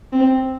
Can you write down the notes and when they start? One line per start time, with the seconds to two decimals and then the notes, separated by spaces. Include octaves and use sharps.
0.13 C4